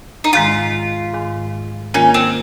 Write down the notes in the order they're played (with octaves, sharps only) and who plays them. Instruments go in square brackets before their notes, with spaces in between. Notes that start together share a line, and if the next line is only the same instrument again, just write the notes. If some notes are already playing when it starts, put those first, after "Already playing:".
[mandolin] D#4
[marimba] G#2 D#3 G#3 [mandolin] F4
[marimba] G#2 D#3 G#3
[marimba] D#3 A#3 F4 A#4 [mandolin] C#4
[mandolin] C4